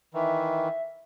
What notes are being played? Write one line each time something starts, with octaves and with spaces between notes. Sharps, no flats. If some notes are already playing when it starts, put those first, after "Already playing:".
D#3 E3 E5